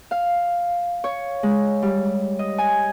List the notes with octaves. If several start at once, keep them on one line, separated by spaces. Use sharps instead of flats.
F5
C#5
G#3
G3
D#5
G#5